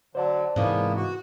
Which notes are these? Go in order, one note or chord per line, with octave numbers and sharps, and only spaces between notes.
D3 F#3 C5 D5 A5
G#2 C3 E3 G#3 A#3 B3
F#4